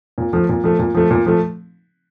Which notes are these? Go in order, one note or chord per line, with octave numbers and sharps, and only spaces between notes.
A#2
F3 A3
A#2
F3 A3
A#2
F3 A3
A#2
F3 A3